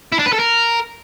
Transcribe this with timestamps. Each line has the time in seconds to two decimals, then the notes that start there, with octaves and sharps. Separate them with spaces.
0.12 E4
0.19 D4
0.26 B4
0.33 A4
0.39 A#4